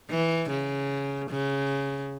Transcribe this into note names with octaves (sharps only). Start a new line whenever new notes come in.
E3
C#3
C#3